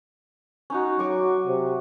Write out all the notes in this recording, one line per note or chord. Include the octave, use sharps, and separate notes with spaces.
C#4 D#4 F#4
F#3 G#5 C#6 D6
C3